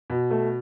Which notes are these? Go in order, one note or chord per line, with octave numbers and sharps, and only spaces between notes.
B2
A3